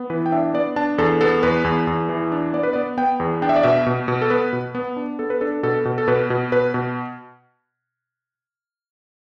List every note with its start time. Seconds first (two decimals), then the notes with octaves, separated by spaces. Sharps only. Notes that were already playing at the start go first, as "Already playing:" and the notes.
Already playing: B3
0.10 E3 B4
0.26 G5
0.32 D4 E5
0.54 B3 D5
0.76 D4 A5
0.98 E2 A4
1.21 B3 A4
1.43 E2 B4
1.64 E2
1.87 E2
2.09 E3
2.32 D4
2.53 B3 D5
2.63 B4
2.73 B3 D5
2.97 B3 G5
3.20 E2
3.42 D4 G5
3.49 E5
3.56 D5
3.63 B2 E5
3.86 B2
4.08 B2
4.22 A4
4.30 B3 B4
4.53 B2
4.75 B3
4.97 D4
5.19 B3 A4
5.30 B4
5.41 D4 A4
5.63 B2 A4
5.85 B2
5.98 A4
6.08 B2 B4
6.30 B2
6.52 B2 B4
6.74 B2